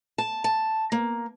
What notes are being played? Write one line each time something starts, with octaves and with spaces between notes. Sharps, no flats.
A5
A5
A#3